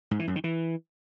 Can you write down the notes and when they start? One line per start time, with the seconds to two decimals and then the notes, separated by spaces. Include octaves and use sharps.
0.11 G#2
0.19 E3
0.27 F#2
0.36 D#3
0.44 E3